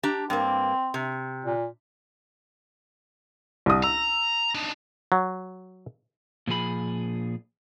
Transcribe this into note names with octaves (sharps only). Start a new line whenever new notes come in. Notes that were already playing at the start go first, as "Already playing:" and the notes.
D4 G4 A#5
G2 A#3 C4
C3
A#2
C2 D#6
A#5 E6
D4 D#4
F#3
A#2 F3 G#4 B5